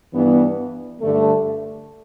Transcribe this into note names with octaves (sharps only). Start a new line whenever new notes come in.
G2 E3 B3
G2 D3 A3